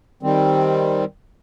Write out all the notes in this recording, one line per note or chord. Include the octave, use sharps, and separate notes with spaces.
D#3 G3 C4